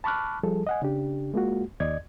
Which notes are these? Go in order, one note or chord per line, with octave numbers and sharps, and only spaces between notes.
A5 B5 C#6 D6 F6 F#6
F3 G3 G#4 A4
D#5 F#5 G#5
C#3 D4 G4
G#3 A#3 F4 F#4
D#2 D5 D#5 G#6